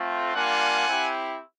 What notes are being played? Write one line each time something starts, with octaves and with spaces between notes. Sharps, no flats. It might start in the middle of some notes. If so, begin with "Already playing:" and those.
Already playing: A3 C4 F4
G3 A#3 D4 F4 F#5 G#5
C4 E4 G4